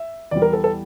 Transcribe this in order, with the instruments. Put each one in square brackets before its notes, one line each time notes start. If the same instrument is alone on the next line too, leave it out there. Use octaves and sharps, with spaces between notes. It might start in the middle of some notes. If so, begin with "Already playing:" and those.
Already playing: [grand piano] E5
E2 E3 G3 D5
A#4
A4
A4